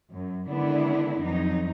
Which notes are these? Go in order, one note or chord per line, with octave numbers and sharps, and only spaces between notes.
F#2
D3 D#3 G#3 B3 D4 E4
F2 F#3 D#4